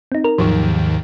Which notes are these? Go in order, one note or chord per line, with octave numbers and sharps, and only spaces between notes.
C4 D#4
A#4
D#2 G#2 D#3 F3 F#3